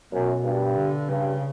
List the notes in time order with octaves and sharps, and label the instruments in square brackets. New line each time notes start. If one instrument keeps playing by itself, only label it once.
[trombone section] F#2 [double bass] B2
[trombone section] G2
[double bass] D3
[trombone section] G2 [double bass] C#3